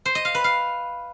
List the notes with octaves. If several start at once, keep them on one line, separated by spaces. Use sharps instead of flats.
C5
D#5
F5
B4
F5